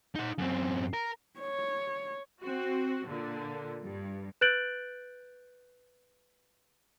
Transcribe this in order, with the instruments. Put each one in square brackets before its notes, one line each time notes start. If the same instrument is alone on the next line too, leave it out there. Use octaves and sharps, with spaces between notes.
[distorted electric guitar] D#4 F#5
F#2 C4
A#4
[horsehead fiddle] C#5
[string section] C4 F#4
A#2 D3
G2
[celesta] B4 F#6 G6 A6 D7 F#7